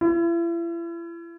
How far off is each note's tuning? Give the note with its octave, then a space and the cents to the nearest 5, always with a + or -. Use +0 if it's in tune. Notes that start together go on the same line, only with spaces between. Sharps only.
E4 +40